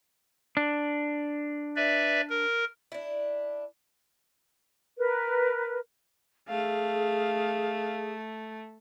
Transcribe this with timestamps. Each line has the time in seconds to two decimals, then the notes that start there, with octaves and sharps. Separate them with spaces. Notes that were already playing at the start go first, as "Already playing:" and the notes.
0.57 D4
1.76 B4 D5 E5
2.30 A#4
2.92 D4 E4
4.98 A#4 B4
6.49 A3 G#4 F5